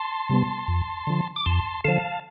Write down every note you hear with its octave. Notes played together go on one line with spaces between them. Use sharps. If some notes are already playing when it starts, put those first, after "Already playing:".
Already playing: A5 C6
C3 G3 B3
F2
D3 F3
D6
F2 A5 C6
D3 F3 F5 A5